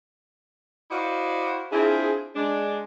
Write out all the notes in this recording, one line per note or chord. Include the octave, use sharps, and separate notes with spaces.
E4 F#4 C5 D5 D#5 F5
C4 D4 E4 F4 G#4
G#3 D4